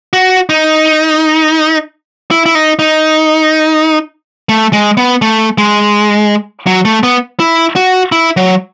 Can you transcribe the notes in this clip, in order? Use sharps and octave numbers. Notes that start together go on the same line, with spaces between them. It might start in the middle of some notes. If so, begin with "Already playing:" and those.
F#4
D#4
E4
E4
D#4
D#4
A3
G#3
B3
A3
G#3
F#3
A3
B3
E4
F#4
E4
F#3